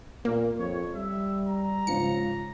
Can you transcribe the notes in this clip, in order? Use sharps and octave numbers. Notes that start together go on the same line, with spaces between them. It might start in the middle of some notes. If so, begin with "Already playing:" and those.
A#2 A#3
F2 C#5
G3 E5
A#5
G#2 C#3 F3 C#7